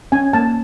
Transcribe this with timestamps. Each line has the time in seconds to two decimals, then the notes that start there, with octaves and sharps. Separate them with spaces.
0.12 C#4 G#5
0.33 A#3 A5